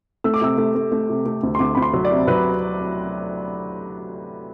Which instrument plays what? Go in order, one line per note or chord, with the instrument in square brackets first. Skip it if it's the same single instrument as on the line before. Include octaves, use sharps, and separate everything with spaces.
[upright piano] A3 E6
D6
C3 E6
A3
A3
A3
C3
A3
D2
C6
D2 D6
D2 B5
C6
F#3
D5
C3
F#3 B4